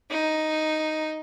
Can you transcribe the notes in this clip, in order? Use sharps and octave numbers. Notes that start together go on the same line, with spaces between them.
D#4